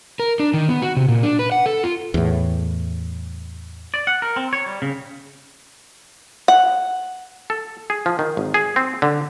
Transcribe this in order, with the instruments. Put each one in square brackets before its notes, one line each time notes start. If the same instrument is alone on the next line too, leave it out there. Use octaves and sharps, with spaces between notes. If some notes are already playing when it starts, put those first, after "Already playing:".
[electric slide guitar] A#4
D4
D#3
B3
F#4
C3
A#2
D4
B4
F#5
A4
F4
[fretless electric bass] E2 A2
[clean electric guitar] D5
F#5
A#4
C4
C#5
G3
C#3
[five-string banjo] F#5
[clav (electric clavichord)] A4
G#4
F3
D#3
G#1
G#4
C4
D3